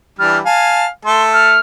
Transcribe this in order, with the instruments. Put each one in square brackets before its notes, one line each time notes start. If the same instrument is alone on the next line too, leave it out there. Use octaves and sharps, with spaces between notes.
[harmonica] E3 G3 D4 [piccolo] F6
[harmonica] F5 G#5 [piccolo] A5
[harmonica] A3 A4 [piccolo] C6
[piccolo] F6